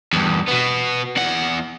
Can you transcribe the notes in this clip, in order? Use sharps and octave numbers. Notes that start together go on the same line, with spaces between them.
E2 G2
B2 B3
E2 F#5